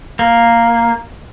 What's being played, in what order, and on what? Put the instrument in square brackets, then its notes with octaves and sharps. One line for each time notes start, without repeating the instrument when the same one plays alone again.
[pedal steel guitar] A#3